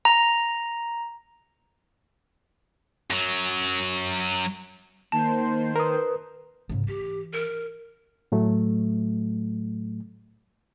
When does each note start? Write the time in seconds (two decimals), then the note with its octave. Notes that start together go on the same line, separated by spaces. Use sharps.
0.05 A#5
3.10 F#2 F#3
5.12 D#3 A#3 C5 A5
5.76 A#4 B4 D#6
6.69 G#2 C#3
6.88 E3 G4
7.33 A#4
8.32 A2 F#3 A3